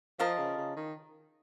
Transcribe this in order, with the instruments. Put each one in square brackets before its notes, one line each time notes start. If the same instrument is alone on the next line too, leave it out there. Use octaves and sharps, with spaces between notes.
[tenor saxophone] F3 [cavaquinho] F4 A#4 D#5 A5
[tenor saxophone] C#3
C#3
D#3